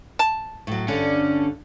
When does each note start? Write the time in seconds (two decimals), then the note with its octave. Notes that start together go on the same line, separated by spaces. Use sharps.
0.19 A5
0.67 A2 F#3
0.88 G2 D3 C#4 D4